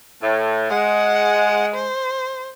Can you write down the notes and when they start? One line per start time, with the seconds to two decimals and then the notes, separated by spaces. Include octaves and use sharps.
0.22 A2
0.70 G#3 F#5
1.74 C5